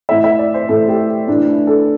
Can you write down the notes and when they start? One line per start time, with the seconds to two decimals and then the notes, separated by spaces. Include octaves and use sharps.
0.09 A2 E3 E5
0.24 E5
0.39 D5
0.54 C5
0.69 A2 E3 A4
0.88 G4
1.28 A2 E3 D4
1.48 E4
1.67 A4